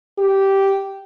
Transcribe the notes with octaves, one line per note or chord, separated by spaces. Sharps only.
G4